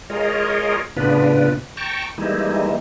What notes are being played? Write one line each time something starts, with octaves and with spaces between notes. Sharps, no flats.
G#3 F4 G#4 A#4 C#5 D#5
A2 C#3 B3 D4 F4 B4
G5 A5 A#5 C#6
E3 G3 G#3 A#3 D#4 E4